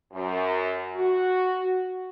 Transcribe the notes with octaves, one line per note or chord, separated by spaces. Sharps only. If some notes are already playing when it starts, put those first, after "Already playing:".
F#2
F#4